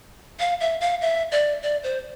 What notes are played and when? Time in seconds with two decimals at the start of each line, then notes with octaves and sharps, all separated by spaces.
0.40 F5
0.60 E5
0.81 F5
1.01 E5
1.32 D5
1.63 D5
1.83 C5